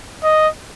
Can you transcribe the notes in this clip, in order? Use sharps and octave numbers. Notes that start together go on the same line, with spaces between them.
D#5